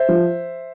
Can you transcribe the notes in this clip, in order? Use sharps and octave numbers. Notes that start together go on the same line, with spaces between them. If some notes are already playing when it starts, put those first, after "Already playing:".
Already playing: C5 E5
F3